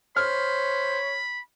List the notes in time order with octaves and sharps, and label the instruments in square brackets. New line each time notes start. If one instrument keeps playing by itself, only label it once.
[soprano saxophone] C5 [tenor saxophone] C#5 [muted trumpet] B5 [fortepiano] F6